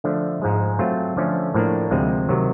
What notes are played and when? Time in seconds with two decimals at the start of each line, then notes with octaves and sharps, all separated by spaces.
0.04 D3 F3 A3 D4
0.42 G#2 F3 G#3
0.79 F#3 A3 C4 F4
1.17 D3 F3 A3 C#4
1.54 A2 F3 A#3 D4
1.91 D2 C3 F3 G#3 C4
2.29 C3 D#3 F#3